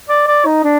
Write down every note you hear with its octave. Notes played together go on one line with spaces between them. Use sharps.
D5
D5
D#4
D4